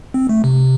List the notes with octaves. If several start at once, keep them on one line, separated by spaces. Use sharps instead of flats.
C4
A3
C3